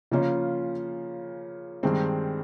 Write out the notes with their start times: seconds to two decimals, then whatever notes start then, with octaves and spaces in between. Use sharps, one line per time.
0.11 C#3 F3 A#3 C#4 F4
1.83 G2 D#3 G#3 C4